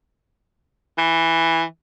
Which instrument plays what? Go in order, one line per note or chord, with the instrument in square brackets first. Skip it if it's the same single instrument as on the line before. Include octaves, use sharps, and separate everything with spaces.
[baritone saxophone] E3